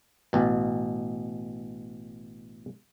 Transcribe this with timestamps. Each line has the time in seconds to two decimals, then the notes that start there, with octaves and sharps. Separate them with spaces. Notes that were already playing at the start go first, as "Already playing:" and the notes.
0.33 A1 B2